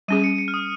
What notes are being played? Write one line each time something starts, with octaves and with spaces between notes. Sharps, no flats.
G3 C#4 G#4 D#7
C#7
C#7
F6
D#6